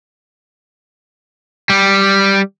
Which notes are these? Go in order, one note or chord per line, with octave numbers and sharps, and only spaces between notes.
G3